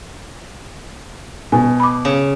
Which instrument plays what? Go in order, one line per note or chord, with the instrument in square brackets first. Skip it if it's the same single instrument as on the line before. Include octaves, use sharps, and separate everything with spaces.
[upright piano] B2 [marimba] G#5
[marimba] B5 D6
[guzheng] C#3